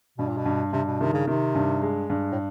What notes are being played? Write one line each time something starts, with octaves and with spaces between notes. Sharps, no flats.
G2 B2
A#2
B2
G2
G2 C3
B2
C3 D#3
C#3
C3 D#3
G2
G#3
G2
A2